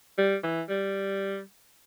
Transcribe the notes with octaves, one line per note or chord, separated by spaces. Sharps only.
G3
E3
G3